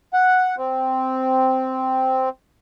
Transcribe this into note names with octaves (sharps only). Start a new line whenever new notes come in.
F#5
C4